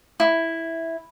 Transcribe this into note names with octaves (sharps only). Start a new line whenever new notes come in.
E4